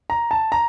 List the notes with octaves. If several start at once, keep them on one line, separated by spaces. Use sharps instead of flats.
A#5
A5
A#5